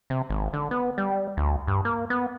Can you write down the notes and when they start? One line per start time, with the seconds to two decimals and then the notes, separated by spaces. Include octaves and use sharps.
0.10 C3
0.29 G#1
0.53 D3
0.71 B3
0.98 G3
1.37 D2
1.67 G2
1.85 A#3
2.10 B3